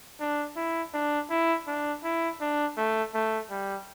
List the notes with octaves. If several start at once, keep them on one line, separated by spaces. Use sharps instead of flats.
D4
E4
D4
E4
D4
E4
D4
A3
A3
G3